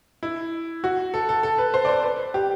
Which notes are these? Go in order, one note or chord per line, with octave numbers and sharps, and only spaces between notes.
E4
F#4
A4
A4
A4
B4
C5
D5
C5
B4
G4